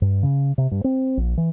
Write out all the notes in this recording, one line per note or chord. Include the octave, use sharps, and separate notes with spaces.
G2
C#3
C3
G2
C4
A#1
E3